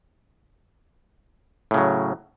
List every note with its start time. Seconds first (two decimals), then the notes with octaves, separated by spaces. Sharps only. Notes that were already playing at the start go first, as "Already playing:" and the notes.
1.71 A2
1.74 C#3
1.78 F#3